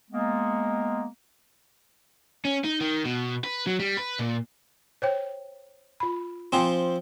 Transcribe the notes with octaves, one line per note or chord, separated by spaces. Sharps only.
G#3 A#3 B3
C#4
D#4
D#3
B2
B4
F#3
G3
B4
A#2
C5 C#5 G5
F4 B5
F3 C4 G5 G#5